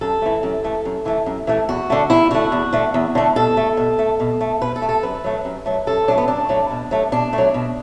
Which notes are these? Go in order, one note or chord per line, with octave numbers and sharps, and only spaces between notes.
F#2 A4
E3 A3
F#2
E3 A3
F#2
E3 A3
F#2
E3 A3
E2 F#4
D3 A3
E2 E4
D3 A3 F#4
E2
D3 A3
E2
D3 A3
B2 A4
A3
B2
A3
B2
A3
B2 B4
A4
A3
A4
F#2 B4
F#3 A3
F#2
F#3 A3
F#2 A4
F#3 A3 D4
B3
F#2 D4
F#3 A3
B2
F#3 A3
B2 D4
A3
F#3
B2